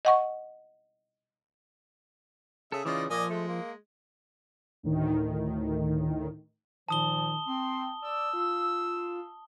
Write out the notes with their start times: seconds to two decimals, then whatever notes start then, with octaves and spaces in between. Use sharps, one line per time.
0.05 D#5 F#5 C#6
2.72 C#3 G#4 A4 E5
2.85 C#3 E3 C#4 D#4 F4 G#4 D5
3.10 A#2 F3 D5 D#5 G#5
3.30 G#3 A3
3.48 A#3
4.83 D2 A2 D#3
6.89 A#2 D#3 F3 A5 D#6 G7
7.47 C4 C6
8.02 D5 E6
8.33 F4